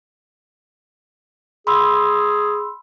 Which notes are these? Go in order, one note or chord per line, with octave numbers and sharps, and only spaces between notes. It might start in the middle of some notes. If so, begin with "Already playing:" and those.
G#4 B5 C6 E6